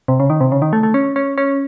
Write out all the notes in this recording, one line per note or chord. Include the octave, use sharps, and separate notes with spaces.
C3
C#3
D#3
C3
C#3
D#3
A3
A3
C#4
C#4
C#4